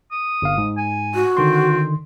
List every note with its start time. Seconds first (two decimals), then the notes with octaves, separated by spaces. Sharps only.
0.11 D#6
0.42 G1 F5
0.58 G#2
0.77 G#5
1.15 F#4
1.37 D3 D#3 C4 C6